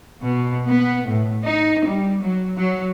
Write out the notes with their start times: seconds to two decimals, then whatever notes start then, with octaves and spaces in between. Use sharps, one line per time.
0.22 B2
0.69 B3
1.07 A2
1.43 D#4
1.85 G3
2.21 F#3
2.58 F#3